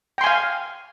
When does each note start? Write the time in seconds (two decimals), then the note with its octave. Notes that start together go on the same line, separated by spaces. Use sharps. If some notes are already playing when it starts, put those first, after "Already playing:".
0.18 G5
0.21 C6
0.24 G#5
0.27 F5